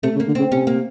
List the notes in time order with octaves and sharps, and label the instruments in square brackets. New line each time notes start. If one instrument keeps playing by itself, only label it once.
[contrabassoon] C3 [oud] A3
[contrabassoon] C#3
[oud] A#3
[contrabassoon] D3
[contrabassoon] C#3 [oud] C4
[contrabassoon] C3 [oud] C#4
[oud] A#3